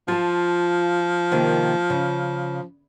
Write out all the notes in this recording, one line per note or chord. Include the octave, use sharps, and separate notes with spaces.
F3 F4 A5
C3 D#3 A#3
C#3